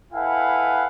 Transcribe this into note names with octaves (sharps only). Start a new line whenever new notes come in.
E4 A4 B4 F5 F#5 G#5